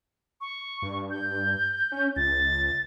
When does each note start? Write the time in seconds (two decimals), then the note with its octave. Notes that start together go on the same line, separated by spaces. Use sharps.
0.41 C#6
0.82 G2
1.11 G6
1.92 C#4
2.16 C#2 A6